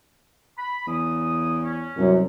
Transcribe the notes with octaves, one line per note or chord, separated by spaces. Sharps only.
B5
E2 C#3 D#6
C#4
C2 F#2